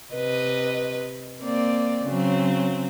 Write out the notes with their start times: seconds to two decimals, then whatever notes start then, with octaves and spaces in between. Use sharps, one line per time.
0.15 C3 B4 D#5
1.41 A#3 C4 D5
2.07 C#3 F#3 C4